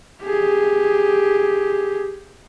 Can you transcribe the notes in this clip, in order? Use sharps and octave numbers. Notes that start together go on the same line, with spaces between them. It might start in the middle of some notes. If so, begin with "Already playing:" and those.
G4 G#4